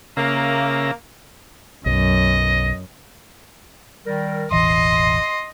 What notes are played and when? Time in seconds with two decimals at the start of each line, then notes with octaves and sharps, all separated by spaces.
0.17 C#3 A#3 E5 A#5
1.86 B1 F#2 D#5
4.06 D#3 G3 A#4
4.51 E1 A1 E3 D#5 C6